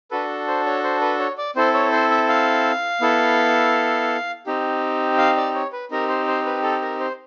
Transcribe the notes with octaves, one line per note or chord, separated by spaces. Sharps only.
D4 F#4 A4 B4
C5
C#5
C5
B4
C#5
D5
C4 E4 A4 C5
C#5
C5
E5
F5
B3 E4 A4
C4 D#4 G4
F5
D5
C#5
B4
C4 D#4 G4 A#4
C5
C5
B4
A4
A#4
C5